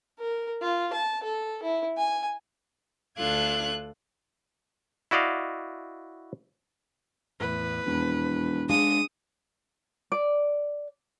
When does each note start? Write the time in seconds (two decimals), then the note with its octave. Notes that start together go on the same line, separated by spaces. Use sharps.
0.19 A#4
0.62 F4
0.93 A5
1.24 A4
1.63 E4
1.97 G#5
3.18 D2 D4 F4 A4 F#6 G#6
5.11 E4 F#4 D5 D#5 F5
7.40 E2 A2 B4
7.86 E1 F2
8.69 G#3 D4 F5 D#6
10.12 D5